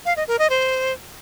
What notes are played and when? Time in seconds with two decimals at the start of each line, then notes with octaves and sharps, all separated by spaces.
0.05 F5
0.17 D#5
0.28 A#4
0.39 D#5
0.50 C5